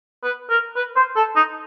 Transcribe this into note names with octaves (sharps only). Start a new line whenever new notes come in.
B4
A#4
B4
C5
A4
D#4